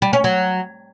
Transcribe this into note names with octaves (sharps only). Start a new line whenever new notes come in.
G3
C#4
F#3